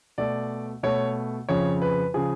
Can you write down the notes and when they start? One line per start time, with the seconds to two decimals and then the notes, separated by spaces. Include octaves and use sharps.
0.18 B2 A3 D5
0.83 B2 A3 C#5
1.49 F2 C#3 F3 C#5
1.82 B4
2.14 C#3 F3 G#4